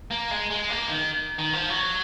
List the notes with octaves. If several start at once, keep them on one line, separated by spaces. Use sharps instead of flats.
A#3
G#3
G#3
A#3
D#3
D#3
F3
F#3